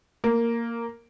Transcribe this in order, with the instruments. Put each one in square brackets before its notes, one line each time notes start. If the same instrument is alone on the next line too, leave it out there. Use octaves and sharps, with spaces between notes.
[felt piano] A#3